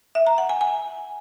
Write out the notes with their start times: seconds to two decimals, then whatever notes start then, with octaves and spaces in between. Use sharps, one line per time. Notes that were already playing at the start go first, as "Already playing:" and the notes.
0.15 E5
0.27 A#5
0.38 F#5
0.49 G#5
0.61 G#5